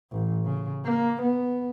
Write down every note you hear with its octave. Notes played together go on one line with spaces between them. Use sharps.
A1
C#3
A#3
B3